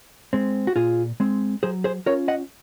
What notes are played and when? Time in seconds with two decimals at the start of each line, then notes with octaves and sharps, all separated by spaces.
0.33 G#3 C4
0.67 F#4
0.76 A#2 F4 G#4
1.20 G#3 C4
1.63 F#3 G#4 C5
1.84 G#4 C5
2.06 C#4 F4 A#4 C#5
2.28 D#5 F#5